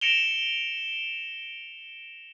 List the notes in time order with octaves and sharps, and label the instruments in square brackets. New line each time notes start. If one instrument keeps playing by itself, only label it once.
[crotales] A#6 C#7 D7 E7 F7 G7